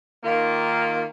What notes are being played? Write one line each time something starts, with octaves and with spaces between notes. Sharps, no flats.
D#3 A#3 F4